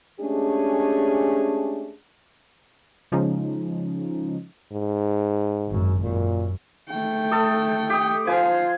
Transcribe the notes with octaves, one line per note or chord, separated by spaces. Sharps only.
G#3 A3 C#4 D4 G4 G#4
C#3 F3 G#3 C#4 D#4
G#2
G#1 F#2
F#2 A#2
A3 G5
A4 D#6
G4 D#6
F3 F4 C5 G#5